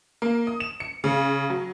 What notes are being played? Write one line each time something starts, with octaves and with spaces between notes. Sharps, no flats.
A#3
D#6
E7
C#7
C#3
F#3